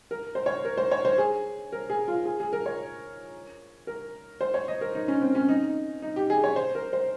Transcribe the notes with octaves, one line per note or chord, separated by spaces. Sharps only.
A#4
C5
C#5
A#4
C5
C#5
C5
G#4
A#4
G#4
F4
G#4
G#4
A#4
C#5
A#4
C5
C#5
D#5
A#4
D#4
C#4
C4
C#4
D#4
D#4
G4
G#4
C#5
C5
A#4
C5